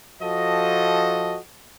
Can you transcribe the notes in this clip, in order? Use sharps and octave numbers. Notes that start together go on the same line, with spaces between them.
F3 F#4 A4 D#5